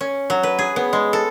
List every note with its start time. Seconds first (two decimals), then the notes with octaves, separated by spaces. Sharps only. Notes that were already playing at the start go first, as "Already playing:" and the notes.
0.01 C#4
0.30 F#3
0.43 B4
0.59 G#4
0.76 B3
0.93 G#3
1.13 A4